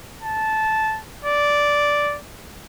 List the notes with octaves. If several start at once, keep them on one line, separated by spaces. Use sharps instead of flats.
A5
D5